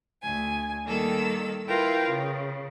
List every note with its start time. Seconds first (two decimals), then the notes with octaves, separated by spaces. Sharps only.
0.22 D2 G#5
0.85 D#3 G3 A#3 A4 E6
1.67 E4 F4 A#4 B4 G5
2.08 C#3